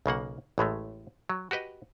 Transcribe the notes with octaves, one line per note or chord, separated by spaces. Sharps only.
B1 C#3 A#3 F#5
A1 A2 G#3 A3
F#3
F#4 G4 B4 D#5